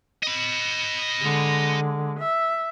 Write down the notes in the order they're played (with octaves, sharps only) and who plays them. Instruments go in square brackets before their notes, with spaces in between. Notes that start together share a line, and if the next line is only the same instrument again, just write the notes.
[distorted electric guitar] D#5 B5
[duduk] D3 [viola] G#3
[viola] E5